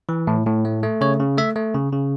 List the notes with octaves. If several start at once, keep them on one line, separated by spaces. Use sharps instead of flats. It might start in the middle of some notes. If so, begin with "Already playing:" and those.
E3
A2
A2
A3
A3
C#3 C#5
C#3
A3 E5
A3
C#3
C#3